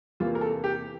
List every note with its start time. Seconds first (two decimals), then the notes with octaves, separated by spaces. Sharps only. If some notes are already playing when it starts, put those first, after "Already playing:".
0.20 E2 C3 E3 A#3 F4
0.35 A#4
0.41 A4
0.64 G4